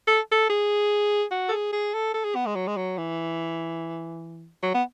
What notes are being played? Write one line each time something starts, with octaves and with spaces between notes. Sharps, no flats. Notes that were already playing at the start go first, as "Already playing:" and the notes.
A4
A4
G#4
F#4
A4
G#4
G#4
A4
A4
G#4
B3
G#3
F#3
G#3
F#3
E3
F#3
B3